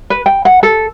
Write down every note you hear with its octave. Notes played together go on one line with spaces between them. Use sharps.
B4
G5
F#5
A4